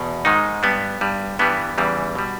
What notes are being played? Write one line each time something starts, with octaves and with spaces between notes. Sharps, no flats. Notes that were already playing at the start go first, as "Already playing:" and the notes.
Already playing: E2 B2
G#2 D#3 G#3 D#4
G2 G3 B3
G2 G3
G2 E3 G3 B3
E2 C#3 E3 G3
B2 G3